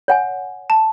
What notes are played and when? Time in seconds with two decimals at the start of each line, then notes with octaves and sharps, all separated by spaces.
0.08 C#5 F#5 G#5
0.70 A5